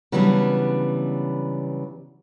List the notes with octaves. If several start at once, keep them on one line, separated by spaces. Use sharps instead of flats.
C#3 E3 F#3 G3 B3 D4